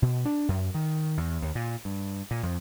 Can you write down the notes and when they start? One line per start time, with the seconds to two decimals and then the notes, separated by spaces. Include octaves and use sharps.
0.02 B2
0.25 D4
0.49 F#2
0.74 D#3
1.17 E2
1.42 D#2
1.55 A#2
1.85 G2
2.31 A#2
2.43 F2